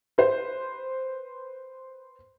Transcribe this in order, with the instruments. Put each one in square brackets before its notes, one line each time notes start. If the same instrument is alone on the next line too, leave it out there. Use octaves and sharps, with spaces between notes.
[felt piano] B4 C5